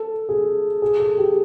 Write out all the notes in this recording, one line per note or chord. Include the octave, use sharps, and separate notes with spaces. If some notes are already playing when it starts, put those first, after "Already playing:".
Already playing: A4
G#4
G#4
A4
G4